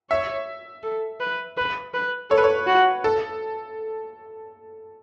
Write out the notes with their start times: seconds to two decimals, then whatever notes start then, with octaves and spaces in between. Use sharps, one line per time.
0.10 C#5 E5
0.84 A4
1.20 B4
1.57 B4
1.94 B4
2.30 A4 C#5
2.38 B4
2.44 C#5
2.67 F#4
3.04 A4